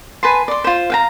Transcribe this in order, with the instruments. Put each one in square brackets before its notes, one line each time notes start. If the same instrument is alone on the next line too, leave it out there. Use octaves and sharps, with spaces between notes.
[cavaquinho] B4 G#5 A5 C6
D5 C6
F4 C5
F5 G5 A#5